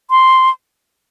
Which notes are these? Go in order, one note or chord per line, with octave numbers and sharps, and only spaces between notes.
C6